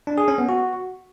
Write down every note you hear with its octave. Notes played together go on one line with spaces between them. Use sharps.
D4
G#4
C#4
B3
F#4